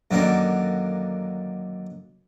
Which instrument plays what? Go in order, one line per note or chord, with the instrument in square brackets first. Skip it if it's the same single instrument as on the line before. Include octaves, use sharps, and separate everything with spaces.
[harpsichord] F#2 D3 D#3 A#3